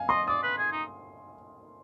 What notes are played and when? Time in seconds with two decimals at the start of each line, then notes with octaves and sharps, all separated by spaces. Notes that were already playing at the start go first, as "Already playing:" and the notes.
Already playing: F5 G#5
0.09 D#5 C6
0.27 D5 D#6
0.43 B4
0.58 G#4
0.72 D#4